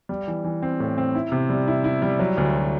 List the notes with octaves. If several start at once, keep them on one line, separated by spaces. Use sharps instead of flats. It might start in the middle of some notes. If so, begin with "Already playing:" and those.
G3
E3
E3
C4
A2
C4
E4
C3
G3
E4
E4
G3
F#3
D2